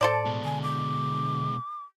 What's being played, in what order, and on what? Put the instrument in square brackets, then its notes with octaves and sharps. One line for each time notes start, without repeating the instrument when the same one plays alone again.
[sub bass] A2 [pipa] A4 C5 D5 [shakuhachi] A5
[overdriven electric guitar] B2 G#3
[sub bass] D3 [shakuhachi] G#5
[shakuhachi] D6